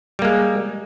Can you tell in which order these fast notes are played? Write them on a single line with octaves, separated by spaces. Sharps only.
G3 A#3 G#3